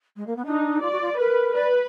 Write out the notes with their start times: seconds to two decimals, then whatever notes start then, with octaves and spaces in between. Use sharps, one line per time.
0.16 G#3
0.26 A#3
0.36 B3
0.45 D4 D#4
0.82 F4 D5
0.91 F#4
1.01 F4
1.18 A#4 B4
1.54 B4 D5